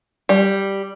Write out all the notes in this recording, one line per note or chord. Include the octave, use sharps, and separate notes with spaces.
G3